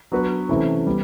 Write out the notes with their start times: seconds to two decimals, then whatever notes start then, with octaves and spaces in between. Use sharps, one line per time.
0.12 F#3 B3 D4 F#4 B4
0.49 C3 E3 A3 C#4 E4
0.87 G3 B3